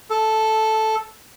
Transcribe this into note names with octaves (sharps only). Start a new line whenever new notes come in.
A4